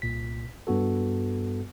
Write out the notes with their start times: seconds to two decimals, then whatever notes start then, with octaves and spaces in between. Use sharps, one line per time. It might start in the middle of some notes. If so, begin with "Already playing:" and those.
0.02 C2 A#2 B6
0.67 G2 B3 F#4 A4